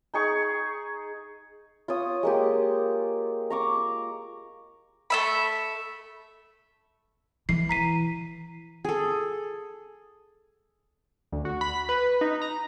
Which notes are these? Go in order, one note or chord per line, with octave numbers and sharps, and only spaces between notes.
D#4 G#4 C#6
F4 C#5 D#6
G#3 A#3 G4
A#5 C#6 D6
A3 E5 B5
E3 C7
A#5 B6 D#7
G#4 A4
D2
F#4
B5
B4
D#4
A#5